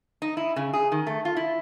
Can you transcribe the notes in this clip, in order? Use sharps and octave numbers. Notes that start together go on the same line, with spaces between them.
D#4
E4
C#3
G#4
D#3
A3
F4
E4